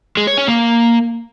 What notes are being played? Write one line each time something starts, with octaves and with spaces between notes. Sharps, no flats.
G#3
C#5
C#4
A#3